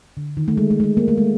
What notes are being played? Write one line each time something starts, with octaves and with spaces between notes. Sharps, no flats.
D3
D#3
A3
G#3
A3
G#3
A3
A#3
A3
G#3